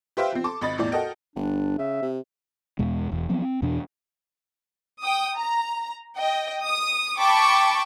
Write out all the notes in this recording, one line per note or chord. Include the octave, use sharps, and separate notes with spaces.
G4 B4 C5 E5 F5 G5
F3 C4
A4 A5 C6 D6
G#1 D#5 B5 A6
E2 A2 D5
F#4 A4 A#4 D#5 G5
G1 D4
C#3 E5
C3
E2 B2 G#3
E1 E2
F3 F#3 B3 C4
C4
E2 B2 E3 D4
G5 D#6
A#5
D#5 G5
D#6
G5 A5 B5 C#6 D6